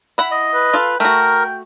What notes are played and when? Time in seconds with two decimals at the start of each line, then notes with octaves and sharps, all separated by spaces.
0.18 E4 F#5 B5
0.31 D#5
0.54 B4
0.73 F4 A4 F5
1.00 A3 F#4 A#4 G5